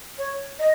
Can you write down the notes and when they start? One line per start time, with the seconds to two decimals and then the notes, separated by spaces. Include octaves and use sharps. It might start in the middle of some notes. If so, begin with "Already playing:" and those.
0.18 C#5
0.59 D#5